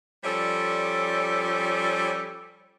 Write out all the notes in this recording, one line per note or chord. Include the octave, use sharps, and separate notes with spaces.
F3 G3 C#4 A4 C#5 D5